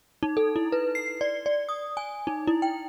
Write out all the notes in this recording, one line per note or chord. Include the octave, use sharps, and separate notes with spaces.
D#4
A4
E4
B4
C7
D5
D5
D#6
G#5
D#4
E4
G5